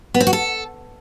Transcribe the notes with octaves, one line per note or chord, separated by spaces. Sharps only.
B3
C4
F#4
A4